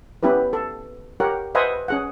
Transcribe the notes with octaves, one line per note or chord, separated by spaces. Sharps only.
B3 C#4 E4 G4 B4
A4
G4 A#4 C#5 F#5
B4 C5 D#5 E5 F#5 G#5
C#4 G#4 F#5